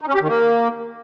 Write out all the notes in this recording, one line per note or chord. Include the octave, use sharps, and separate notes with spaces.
D#4
C#4
G4
D#3
A#3